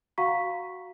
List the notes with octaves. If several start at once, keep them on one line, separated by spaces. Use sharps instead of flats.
F#4 F5 F#5 A#5 C#6 B6